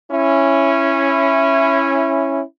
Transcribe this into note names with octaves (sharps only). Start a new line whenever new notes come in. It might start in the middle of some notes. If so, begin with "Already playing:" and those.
C#4 E4